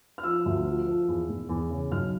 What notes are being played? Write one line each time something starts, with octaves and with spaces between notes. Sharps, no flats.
F6
F3 E6
D2
F3
F3
E2
E1
E2
C#3
B1 F6